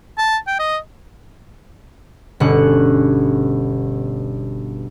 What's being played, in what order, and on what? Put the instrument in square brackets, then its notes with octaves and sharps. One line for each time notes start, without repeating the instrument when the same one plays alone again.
[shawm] A5
G5
D#5
[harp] G1 B2 C#4 F#6